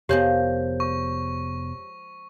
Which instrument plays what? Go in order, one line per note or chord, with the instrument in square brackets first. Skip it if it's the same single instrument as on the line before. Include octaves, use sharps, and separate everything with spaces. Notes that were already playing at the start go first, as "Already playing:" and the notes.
[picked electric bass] F1 B3 [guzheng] F3 G#3 A#3 [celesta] G4 C#5 G6
[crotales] C#6